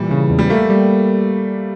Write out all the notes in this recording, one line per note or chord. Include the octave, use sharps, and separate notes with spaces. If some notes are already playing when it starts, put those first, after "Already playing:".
Already playing: A#2 E3 G3
C#3
E2
G3
A3 A#3
G3